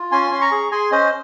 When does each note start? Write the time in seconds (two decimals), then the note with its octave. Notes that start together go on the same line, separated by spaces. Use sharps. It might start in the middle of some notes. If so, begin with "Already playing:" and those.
Already playing: F4
0.12 C#4 G#5 C6
0.31 C#4 C6
0.41 A#5 C#6
0.52 G#4
0.71 G#4 G#5 C6
0.92 C#4 C5 D#5